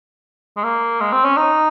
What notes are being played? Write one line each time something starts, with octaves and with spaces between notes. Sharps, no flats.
G#3
A#3
G#3
C4
C#4
D#4